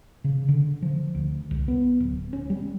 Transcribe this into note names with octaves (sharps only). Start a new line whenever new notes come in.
C#3
D3
F3
D2
C2
B3
D1
C#4
G3